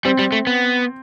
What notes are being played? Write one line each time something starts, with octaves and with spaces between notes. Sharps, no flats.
G3 C4
G3
A3
B3